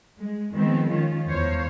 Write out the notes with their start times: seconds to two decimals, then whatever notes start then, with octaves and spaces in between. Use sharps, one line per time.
0.19 G#3
0.53 D#3 F3 G#3 B3 C4
0.89 D#3 C#4 F4
1.30 E2 C5 C#5 F5